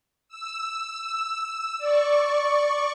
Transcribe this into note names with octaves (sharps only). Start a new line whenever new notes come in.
E6
D5 C#6